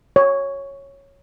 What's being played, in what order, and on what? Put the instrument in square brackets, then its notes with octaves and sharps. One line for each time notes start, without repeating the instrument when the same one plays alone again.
[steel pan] C#5